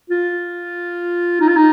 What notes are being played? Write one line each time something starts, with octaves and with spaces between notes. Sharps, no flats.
F4
D#4
F4
D#4